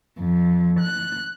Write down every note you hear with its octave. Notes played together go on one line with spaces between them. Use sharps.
F2
F#6